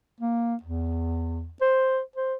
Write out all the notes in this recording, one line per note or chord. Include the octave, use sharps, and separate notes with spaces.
A#3
E2
C5
C5